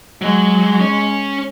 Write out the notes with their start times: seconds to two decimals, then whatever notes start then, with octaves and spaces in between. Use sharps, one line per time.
0.22 F#3 G#3
0.80 C#4 C#5